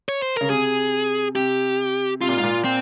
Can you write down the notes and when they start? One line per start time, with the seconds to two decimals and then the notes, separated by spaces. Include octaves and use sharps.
0.09 C#5
0.22 C5
0.36 C#3 A#4
0.50 C3 G#4
1.35 C3 G4
2.21 C3 F4
2.29 A#2
2.37 G#2
2.43 A#2
2.64 C4